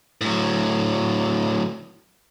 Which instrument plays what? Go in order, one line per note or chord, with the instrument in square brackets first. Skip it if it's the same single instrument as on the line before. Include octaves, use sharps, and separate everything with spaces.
[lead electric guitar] A2 F#3